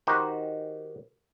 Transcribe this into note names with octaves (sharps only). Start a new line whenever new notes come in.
D#3 D#4 F#4 G4 C5